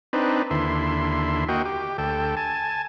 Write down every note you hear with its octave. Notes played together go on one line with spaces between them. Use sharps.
C4 D4 D#4 B4
D#2 D3 E4 C6
A#3 F#4 D#5 G5
G4
D2 A4 G5
G#5 A5